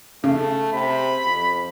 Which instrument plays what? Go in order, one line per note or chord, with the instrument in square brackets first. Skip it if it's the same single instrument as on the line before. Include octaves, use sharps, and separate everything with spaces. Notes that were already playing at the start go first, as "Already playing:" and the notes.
[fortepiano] C#3 [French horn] A3
[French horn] C3 [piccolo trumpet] B5
[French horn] F2